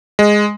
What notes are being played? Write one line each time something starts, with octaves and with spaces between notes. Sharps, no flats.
G#3